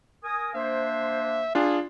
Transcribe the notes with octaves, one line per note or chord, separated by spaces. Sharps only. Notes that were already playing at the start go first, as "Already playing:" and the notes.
A#4 G#5 D#6
A#3 D4 C5 E5
D4 F4 G#4